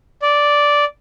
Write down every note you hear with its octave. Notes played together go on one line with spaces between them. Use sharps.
D5